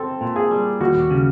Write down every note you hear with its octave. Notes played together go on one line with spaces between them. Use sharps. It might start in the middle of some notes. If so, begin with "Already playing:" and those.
Already playing: C4 A4
A#2
G#4
G3
D#2 F#4
C#3